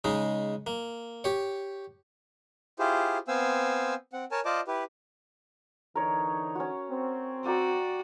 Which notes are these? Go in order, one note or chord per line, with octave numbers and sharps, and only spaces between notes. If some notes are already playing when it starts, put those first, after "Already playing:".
C#3 G#3 D#4
A#3
G4 C#5
E4 F4 G4 G#4 C5
B3 C4 C5 F5 G#5 E6
C4 F#5
A#4 C#5 G#5 A5
F4 C5 D5 D#5 A5 D6
E4 G4 B4
D3 E3 D#4 A#4 C#5
C#4 F#4
C4
F#4 D5 G5 A#5